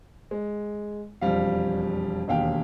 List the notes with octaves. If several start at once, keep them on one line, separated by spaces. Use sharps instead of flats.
G#3
E1 F2 G3 F5
E1 D#2 F5 G5